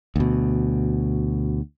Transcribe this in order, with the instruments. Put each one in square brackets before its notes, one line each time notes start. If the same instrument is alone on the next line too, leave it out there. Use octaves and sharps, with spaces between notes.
[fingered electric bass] D2 B2